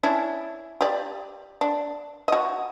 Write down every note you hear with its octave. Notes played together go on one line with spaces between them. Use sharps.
C#4 D4 E4
G4 D5
D4
F#4 D#5